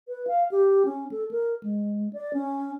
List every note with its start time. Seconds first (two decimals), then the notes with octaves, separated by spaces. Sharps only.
0.08 B4
0.27 F5
0.52 G4
0.85 C#4
1.12 A4
1.31 A#4
1.63 G#3
2.13 D5
2.34 C#4